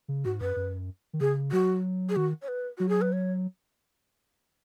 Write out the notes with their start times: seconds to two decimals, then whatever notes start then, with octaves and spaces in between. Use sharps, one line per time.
0.08 C#3
0.24 G#2 F#4
0.41 F#2 B4
0.56 F#2
1.13 D#3
1.21 C#3 G#4
1.52 F#3 F#4
2.09 G#4
2.16 D#3 F#4
2.42 C#5
2.48 B4
2.78 F#3 F#4
2.89 G#4
3.01 B4
3.12 C#5